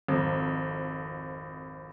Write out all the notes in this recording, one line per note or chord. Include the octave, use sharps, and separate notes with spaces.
G#1 F2